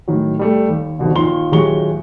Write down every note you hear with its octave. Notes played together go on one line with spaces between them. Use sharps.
A2 D#3 F#3
G3 A3
D#2
G#1 G2 B2 D3
D#2 A#2 D#3 C6 G7
D#1 F#3 G#3 G4 C#6 G7